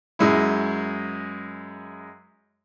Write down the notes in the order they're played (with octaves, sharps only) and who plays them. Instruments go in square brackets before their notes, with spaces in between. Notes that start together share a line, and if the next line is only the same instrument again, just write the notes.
[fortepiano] F#2 G#3 E4